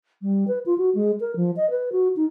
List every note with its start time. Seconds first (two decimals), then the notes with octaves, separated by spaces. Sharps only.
0.22 G3
0.48 B4
0.66 F4
0.78 F#4
0.95 G#3
1.20 A#4
1.36 F3
1.56 D#5
1.70 B4
1.92 F#4
2.16 D#4